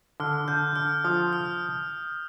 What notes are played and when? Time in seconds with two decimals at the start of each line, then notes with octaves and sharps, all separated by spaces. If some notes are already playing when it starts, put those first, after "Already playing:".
0.20 D3 F6
0.48 D3 G6
0.76 D3 F6
1.04 F3 D#6
1.33 F6